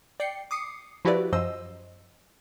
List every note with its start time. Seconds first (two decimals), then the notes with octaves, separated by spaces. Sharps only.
0.20 D5 G5 C7 C#7
0.51 D6 D#6 C7 C#7
1.05 F3 E4 F#4 G4 B4 D5
1.33 F#2 F3 C5 D#5 E6